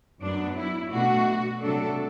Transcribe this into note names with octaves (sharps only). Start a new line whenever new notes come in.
F#2 F#3 B3 D4
E4
B2 A3 D4 F#4
C3 F#3 A3 D4 A4